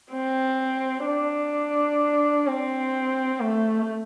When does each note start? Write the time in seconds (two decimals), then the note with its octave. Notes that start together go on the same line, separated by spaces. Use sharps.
0.12 C4
1.06 D4
2.47 C4
3.40 A3